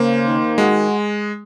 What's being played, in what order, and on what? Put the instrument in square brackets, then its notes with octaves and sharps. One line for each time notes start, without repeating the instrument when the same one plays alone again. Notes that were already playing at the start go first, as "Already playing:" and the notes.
Already playing: [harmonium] C#3 C5 [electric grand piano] A#3
[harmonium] D#3
[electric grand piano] G#3 [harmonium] F#4